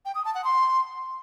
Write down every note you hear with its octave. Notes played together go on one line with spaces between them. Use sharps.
G5
D#6
A5
F#5
C6